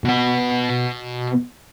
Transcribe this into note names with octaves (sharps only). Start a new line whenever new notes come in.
B2 F#5